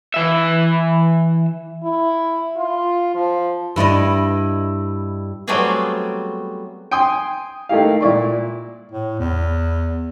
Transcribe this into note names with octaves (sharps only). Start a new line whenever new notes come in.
E3 E5
E4
F4
F3
G2 E4 D5 D#5
F#3 G3 A3 B3 C4 G#4
G5 G#5 C6 D#6
A3 A#3 D#4 E4 G4 F5
A#2 E4 D5 C#6
A2
E2